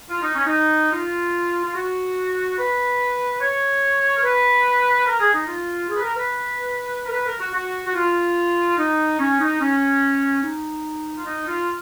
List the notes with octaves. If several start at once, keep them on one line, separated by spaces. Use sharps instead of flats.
F4
D#4
C#4
D#4
F4
F4
F#4
B4
C#5
A#4
B4
A#4
G#4
D#4
F4
G#4
B4
A#4
B4
A#4
B4
A#4
F#4
F#4
F#4
F4
D#4
C#4
D#4
C#4
D#4
F4
D#4
F4